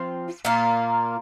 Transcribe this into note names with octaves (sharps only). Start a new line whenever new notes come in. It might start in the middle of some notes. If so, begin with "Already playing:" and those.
Already playing: F3 C4 F4
A#2 A#3 F4